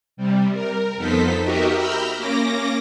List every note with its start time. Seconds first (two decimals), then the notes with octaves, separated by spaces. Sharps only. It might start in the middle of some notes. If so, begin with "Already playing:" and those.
0.17 C3 G3
0.53 A#4
0.97 F2 B3 D#4 A4 C5 B6
1.43 F#4 G4 A#4 D#5 E5
1.74 A#5 B5 E6 F6 G6
2.17 A#3 C#4 D6 A#6